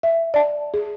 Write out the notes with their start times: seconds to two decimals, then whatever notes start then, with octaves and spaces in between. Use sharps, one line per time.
0.03 E5
0.34 D5 A5
0.74 G#4